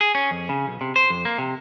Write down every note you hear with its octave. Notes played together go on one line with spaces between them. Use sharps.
G#4
C#4
F2
C#3
B1
C3
C5
F2
A#3
C3